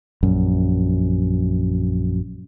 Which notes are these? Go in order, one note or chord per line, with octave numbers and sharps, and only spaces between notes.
A#1 F#2